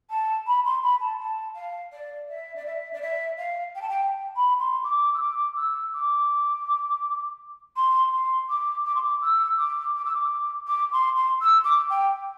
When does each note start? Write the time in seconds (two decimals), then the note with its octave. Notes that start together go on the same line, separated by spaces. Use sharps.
0.10 A5
0.47 B5
0.65 C6
0.83 B5
1.00 A5
1.19 A5
1.55 F5
1.92 D5
2.29 E5
2.56 D5
2.66 E5
2.93 D5
3.02 E5
3.38 F5
3.75 G5
3.81 A5
3.89 G5
4.36 B5
4.59 C6
4.84 D6
5.14 E6
5.20 D6
5.57 E6
5.94 D6
7.76 C6
8.13 C6
8.49 D6
8.85 D6
8.95 C6
9.03 D6
9.22 E6
9.58 D6
9.95 D6
10.05 E6
10.14 D6
10.67 D6
10.92 C6
11.17 C6
11.40 E6
11.64 D6
11.90 G5